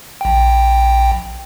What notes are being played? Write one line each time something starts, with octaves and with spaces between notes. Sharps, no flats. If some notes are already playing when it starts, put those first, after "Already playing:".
A#1 G5